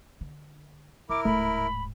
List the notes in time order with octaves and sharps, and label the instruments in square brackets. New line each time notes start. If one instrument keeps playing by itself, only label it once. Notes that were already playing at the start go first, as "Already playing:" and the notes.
[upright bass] D3
[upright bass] F#1 [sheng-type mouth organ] E4 A#4 [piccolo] D6
[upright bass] D1 G#2 [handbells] A3 [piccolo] B5